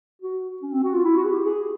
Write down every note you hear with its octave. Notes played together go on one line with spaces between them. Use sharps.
F#4
C#4
C4
F#4
F4
E4
F#4
G#4
G4
G#4